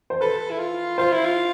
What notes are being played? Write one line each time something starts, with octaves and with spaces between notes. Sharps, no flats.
C5
A4 B4
E4
F4
F4 C5
E4
F4